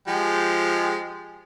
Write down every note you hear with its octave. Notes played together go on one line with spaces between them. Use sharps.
F3 G#3 G4